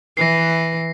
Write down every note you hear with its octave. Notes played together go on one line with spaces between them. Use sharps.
E3 B4 A#6 C7